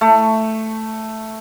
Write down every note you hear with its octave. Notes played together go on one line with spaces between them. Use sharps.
A3